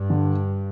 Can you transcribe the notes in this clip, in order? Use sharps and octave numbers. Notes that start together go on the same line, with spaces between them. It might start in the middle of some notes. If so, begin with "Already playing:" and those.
Already playing: G2
D3